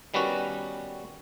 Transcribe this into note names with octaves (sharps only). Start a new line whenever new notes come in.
D#3 G3 B3 C#4 F#4